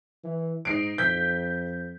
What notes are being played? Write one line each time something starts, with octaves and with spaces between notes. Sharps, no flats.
E3
G#2 D#4 C7 D7
F2 G6 B6